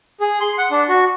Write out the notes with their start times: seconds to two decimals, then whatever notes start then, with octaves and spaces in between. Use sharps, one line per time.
0.20 G#4
0.41 C6
0.58 F#5
0.71 D4
0.89 F#4